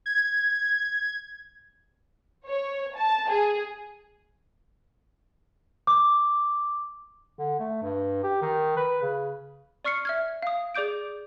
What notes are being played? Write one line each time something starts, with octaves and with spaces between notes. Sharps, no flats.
G#6
C#5
A5
G#4
D6
D3
A3
G2
G4
D#3
B4
C#3
D5 C#6 F6 C7 C#7
E5 F6 G#6
F5 D#6
G#4 D5 D6 G6 D7